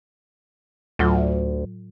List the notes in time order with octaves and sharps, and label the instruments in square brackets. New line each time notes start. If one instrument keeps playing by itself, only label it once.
[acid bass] D2 [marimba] A2 F#3 F4